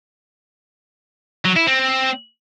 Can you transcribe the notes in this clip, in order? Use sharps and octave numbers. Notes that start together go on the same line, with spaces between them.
F#3
E4
C4